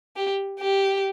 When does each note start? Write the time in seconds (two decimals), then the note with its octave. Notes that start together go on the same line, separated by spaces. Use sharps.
0.16 G4
0.60 G4